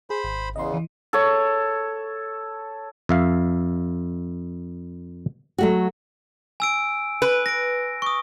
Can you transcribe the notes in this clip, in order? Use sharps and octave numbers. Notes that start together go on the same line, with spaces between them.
G#4 C5 B5
G#1
E2 C#3 D#5 C6
E3
A4 C#5
F2 E5 F5
F#3 A3 F#4
G#5 E6 D7
B4
A#6 D7
C#6 D#6